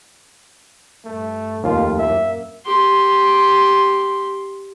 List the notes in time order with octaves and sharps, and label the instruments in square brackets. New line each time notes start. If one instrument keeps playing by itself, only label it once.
[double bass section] G2 [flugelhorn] A3
[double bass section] F1 A3 [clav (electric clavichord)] D#2 [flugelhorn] F4
[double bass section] F#2 A#3 [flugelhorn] E5
[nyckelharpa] G4 C6